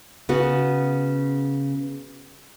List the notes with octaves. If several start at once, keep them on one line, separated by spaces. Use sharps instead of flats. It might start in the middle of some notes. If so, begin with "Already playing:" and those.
C#3 B3 F#4